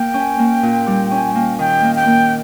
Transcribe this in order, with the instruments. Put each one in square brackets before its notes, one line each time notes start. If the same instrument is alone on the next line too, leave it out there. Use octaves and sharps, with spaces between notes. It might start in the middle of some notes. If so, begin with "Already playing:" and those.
Already playing: [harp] A#3 [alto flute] G5
[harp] C#4
A#3
A#2
G3
C#4
A#3
[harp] D#3 [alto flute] G5
[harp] A#3
[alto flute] G5
[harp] A#3